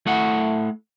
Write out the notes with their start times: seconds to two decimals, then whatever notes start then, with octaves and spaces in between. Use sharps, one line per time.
0.06 A3 E4 F#5